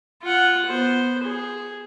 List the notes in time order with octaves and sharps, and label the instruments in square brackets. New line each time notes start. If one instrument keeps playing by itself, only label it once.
[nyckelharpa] F4 F#5
B3 C5
G#4